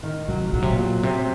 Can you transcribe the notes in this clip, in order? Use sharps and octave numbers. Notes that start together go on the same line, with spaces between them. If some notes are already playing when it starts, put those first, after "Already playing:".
D#3
C3 F#3
A#2 F#3
C3
A#2
F#3
C3 C4